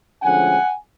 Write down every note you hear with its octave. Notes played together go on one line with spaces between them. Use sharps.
D2 D3 F3 G#3 C#4 F#5 G#5